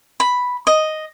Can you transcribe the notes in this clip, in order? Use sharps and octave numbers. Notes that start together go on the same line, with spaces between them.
B5
D#5